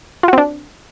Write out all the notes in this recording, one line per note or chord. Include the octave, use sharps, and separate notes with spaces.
C4 D4 F4 F#4